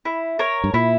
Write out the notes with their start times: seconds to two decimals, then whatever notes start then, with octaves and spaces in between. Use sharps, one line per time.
0.05 E4
0.39 A#4 C#5
0.64 G2
0.74 A#2 E4